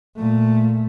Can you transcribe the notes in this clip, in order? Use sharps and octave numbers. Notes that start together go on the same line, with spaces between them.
A#2 A3